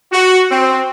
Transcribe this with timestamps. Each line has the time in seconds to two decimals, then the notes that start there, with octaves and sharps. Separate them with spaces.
0.12 F#4
0.50 C4